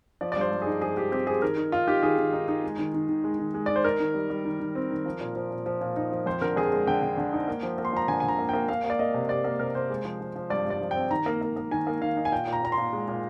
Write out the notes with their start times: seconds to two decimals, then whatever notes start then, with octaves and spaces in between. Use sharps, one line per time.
0.21 F3 D5
0.32 D5
0.36 G2 C5
0.52 G2
0.62 D#4 G#4
0.81 F3 G#4
0.97 F3 G4
1.12 C4 G4
1.27 F3 G#4
1.42 D#3 A#4
1.57 D#4
1.72 D#4 F4
1.87 D#4 G4
2.03 D#3 G#4
2.18 D#3
2.33 D#4
2.48 D#4
2.64 G#3
2.79 D#3
2.94 D#3
3.09 D#3
3.24 G#3
3.39 D#3
3.54 G#3
3.66 D#3 D5
3.76 C5
3.84 D#4 A#4
4.00 D#3
4.14 G3
4.30 G3
4.45 D#3
4.60 D#3
4.75 C4
4.90 D#3
5.05 F3
5.21 A#2
5.36 F3
5.51 A#2
5.66 F3
5.81 A#2
5.96 D#4
6.12 F3
6.26 F2 C5
6.41 D3 A#4
6.56 F2 G#4
6.72 G#3
6.87 D3 G5
7.02 D3
7.17 D3
7.33 D#4
7.48 A#3
7.63 F3
7.78 A#3
7.85 C6
7.93 F3 A#5
8.08 D3 G#5
8.20 G#5
8.23 D3
8.28 A#5
8.39 A#3
8.49 A#3 G5
8.69 A#3 F5
8.84 A#3
8.90 D5
8.99 A#3 D#5
9.14 C3
9.29 C3 D5
9.44 A#3
9.59 C3 A#4
9.75 C3 C5
9.90 G#3
10.05 F3
10.20 F3
10.35 F3
10.50 G2 D5
10.66 G2 D5
10.81 F3
10.91 C4 G5
11.11 D#3 A#5
11.26 A#3
11.42 A#3
11.56 A#3
11.71 D#3 G#5
11.87 A#3
12.01 D#3 F5
12.17 D#4
12.25 G#5
12.32 A#2 G5
12.47 A#2
12.53 A#5
12.63 A#2 A#5
12.72 C6
12.78 A#2
12.93 G#3
13.08 A#2